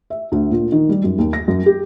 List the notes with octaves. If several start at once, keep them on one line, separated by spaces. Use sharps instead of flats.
E5
D2
A#2
D#3
G3
F#2
D#2
A#6
F#2
G4